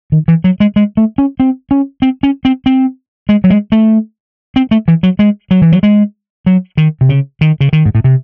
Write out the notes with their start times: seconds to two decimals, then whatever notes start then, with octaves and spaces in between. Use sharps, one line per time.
0.12 D#3
0.28 E3
0.44 F#3
0.60 G#3
0.76 G#3
0.97 A3
1.18 C#4
1.40 C4
1.71 C#4
2.02 C4
2.23 C#4
2.45 C4
2.66 C4
3.29 G#3
3.44 F#3
3.50 G#3
3.72 A3
4.56 C4
4.71 A3
4.88 E3
5.03 F#3
5.19 G#3
5.51 F#3
5.62 E3
5.72 F#3
5.83 G#3
6.46 F#3
6.77 D#3
7.01 C3
7.09 C#3
7.41 D#3
7.61 C#3
7.73 D#3
7.85 G#2
7.95 A2
8.04 C3